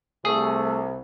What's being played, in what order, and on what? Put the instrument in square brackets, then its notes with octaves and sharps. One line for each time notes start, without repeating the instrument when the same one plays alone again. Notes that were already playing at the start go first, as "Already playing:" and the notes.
[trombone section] C2 [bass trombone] A3 [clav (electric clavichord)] G#4